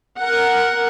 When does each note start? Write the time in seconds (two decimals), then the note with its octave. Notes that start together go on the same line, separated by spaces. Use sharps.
0.18 A#4 F#5